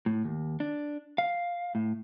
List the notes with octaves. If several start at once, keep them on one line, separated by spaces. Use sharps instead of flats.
A2
D#2
D4
F5
A2